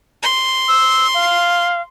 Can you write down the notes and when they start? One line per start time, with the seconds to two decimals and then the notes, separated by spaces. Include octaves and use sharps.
0.23 C6
0.68 E6
1.14 F5